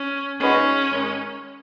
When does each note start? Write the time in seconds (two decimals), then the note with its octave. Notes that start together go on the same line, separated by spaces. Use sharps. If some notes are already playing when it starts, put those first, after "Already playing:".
Already playing: C#4
0.40 A#2 G#3 C#4 D#4 F#4 B4
0.91 G#2 D#3 G#3